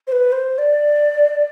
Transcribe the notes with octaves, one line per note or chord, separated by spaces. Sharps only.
C5
B4
C5
D5